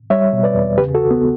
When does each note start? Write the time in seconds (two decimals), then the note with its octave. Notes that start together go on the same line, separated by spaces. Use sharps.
0.10 G3 C#5 E5
0.33 B2
0.43 B4 D5
0.55 E2
0.78 C#3 G4 B4
0.95 F#4 A4
1.01 C#2
1.11 B3